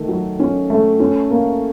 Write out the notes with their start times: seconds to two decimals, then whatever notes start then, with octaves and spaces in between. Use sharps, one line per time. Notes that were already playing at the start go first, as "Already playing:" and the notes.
Already playing: D#3 A3
0.08 F#3
0.40 C#4
0.70 A3
1.00 C#4
1.30 A#3